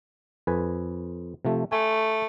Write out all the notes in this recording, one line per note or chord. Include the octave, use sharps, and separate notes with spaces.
F2 B4 G#5
C3 F3 A3
A3 G#5